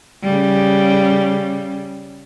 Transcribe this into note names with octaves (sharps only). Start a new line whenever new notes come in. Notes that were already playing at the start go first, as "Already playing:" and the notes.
C#3 G3